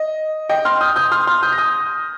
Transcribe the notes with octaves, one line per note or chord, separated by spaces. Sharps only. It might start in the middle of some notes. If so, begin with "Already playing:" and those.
Already playing: D#5
D#5 G5
C6 F6
D#6 G6
D#6 G6
C6 F6
C6 F6
D#6 G6
A#6
D#6 G6